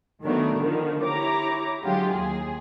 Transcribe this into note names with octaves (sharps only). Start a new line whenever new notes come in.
D#3 F#3 A3 B3 D4 A#4
D3 D#3 F3
E4 G4 C#5 A#5 D6
D3 F#3 G#3 F4 G4
D#2 G#4